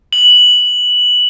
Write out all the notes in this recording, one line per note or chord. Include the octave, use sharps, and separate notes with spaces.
F#7